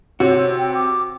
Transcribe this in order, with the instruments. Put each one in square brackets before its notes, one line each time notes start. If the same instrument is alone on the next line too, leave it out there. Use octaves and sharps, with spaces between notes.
[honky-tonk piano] C3 [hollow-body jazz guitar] F#4 [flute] C#5
[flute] G5
D6